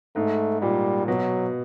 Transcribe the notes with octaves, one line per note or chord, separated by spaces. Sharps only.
G#2 A3
A#2 G3
B2 F#3